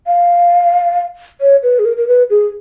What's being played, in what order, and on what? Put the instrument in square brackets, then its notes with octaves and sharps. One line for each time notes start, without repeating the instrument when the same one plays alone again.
[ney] F5
C#5
B4
G#4
A#4
A#4
B4
G#4